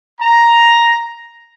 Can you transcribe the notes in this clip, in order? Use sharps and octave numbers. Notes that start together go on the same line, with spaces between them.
A#5